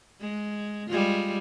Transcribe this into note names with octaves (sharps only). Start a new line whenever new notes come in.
G#3
G3 G#3 F4